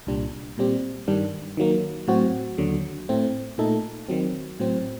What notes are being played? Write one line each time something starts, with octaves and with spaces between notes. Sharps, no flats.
C2 A#2 G3 D4
A#2 G3 C4 G4
G2 D#3 G3 D4
D#3 F#3 A#3
A2 F#3 C4 F#4
D#2 D3 F#3
A2 A3 C4
A#2 A3 D#4 A4
D#3 F#3 C4
A2 F#3 C4